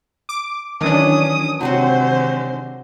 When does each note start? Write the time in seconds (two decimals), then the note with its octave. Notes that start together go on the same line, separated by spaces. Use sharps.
0.29 D6
0.81 D#3 E3 F#3 C#4 D4 D#6
1.61 C3 F#3 G#3 C4 F#4 C5